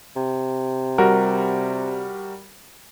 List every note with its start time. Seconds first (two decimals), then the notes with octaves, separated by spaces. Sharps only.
0.16 C3
0.98 G3 F#4 A#4